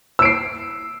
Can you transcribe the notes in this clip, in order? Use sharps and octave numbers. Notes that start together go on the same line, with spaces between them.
E6 C7 D7